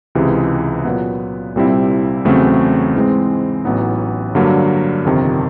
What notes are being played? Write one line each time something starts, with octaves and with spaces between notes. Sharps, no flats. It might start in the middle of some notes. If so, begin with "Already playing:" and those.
C#2 C3 E3 G#3
A#2 F#3 B3
C2 A#2 G3 C4 E4
E2 C#3 F#3 A3 C4
G#2 E3 G#3 C4
A1 A2 F#3 B3 D#4
G2 D3 F#3 A#3
G1 F2 C3 D#3